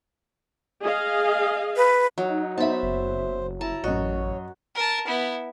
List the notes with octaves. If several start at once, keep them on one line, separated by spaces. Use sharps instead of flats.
G#4 D#5 F5
B4
F#3 D#4
B3 C5 E5 A5 B5
F#1
E4 A5 A#5
A1 F#2 F#4 C#5 D#5
A#4 A5
B3 E4